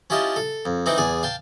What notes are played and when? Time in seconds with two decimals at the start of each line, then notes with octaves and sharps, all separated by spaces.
0.10 C#4 E4 F4 G4 D#5 A5
0.36 A4
0.65 F2
0.86 E3 C4 D#4 E4
0.98 E2 G#4 D5 G#5
1.23 F5 G5 A5